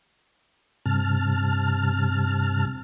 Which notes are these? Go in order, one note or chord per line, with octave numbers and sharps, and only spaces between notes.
G2 C3 A5 F6